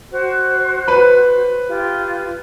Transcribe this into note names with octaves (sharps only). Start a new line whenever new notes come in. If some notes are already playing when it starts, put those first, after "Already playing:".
F#4 C5
B4 B5
F4 G4